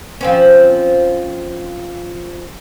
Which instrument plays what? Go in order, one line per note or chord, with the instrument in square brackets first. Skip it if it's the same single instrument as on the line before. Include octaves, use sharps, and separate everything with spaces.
[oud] F3 C4 C#4